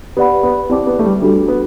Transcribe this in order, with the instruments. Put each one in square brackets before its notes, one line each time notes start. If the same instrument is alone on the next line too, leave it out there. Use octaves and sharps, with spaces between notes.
[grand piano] B3 [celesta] G4 B4 D5 F#5 B5
[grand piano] B3
[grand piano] C4 [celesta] E4 G4 D5 A5 D6
[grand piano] B3
A3
G3
[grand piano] G3 [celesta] D4 F#4 A4
[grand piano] B3